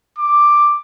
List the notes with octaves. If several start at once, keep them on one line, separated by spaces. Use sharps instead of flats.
D6